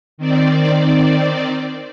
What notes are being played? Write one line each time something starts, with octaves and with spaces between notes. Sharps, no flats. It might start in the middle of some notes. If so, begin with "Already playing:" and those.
D#3 C4 D5